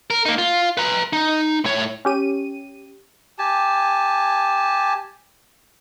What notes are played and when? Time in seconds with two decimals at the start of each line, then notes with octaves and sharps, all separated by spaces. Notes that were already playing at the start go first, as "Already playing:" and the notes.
0.10 A#4
0.26 A#3 D#4
0.38 F4
0.77 B4 A#5
1.13 D#4
1.65 A2 C#5
2.05 C#4 G4 D#7
3.39 G4 G#5 A5